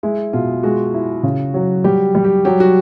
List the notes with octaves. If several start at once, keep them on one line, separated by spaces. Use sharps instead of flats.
G#3 E4
B2 F4
G#3 F#4
E4
C#3
F#3
G3 G4
G3
G4
F#3 G4
F#4